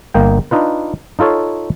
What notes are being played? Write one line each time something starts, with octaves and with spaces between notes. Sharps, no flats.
G1 A#3 D#5 G5
D4 D#4 F4 B4
D#4 F4 A4 C#5 F5